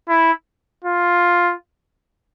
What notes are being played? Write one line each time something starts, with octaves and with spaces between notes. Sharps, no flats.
E4
F4